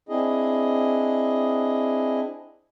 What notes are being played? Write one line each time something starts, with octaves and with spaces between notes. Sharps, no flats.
C4 D4 E4 G#4 D#5